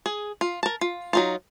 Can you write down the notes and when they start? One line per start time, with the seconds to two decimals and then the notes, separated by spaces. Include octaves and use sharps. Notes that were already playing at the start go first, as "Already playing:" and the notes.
0.06 G#4
0.41 F4
0.63 A#4 A5
0.81 F4
1.13 F#3 D#4 F4